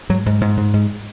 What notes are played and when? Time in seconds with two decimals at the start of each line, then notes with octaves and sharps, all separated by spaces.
0.09 G#2 F#3
0.26 G#2
0.41 G#2
0.57 G#2
0.74 G#2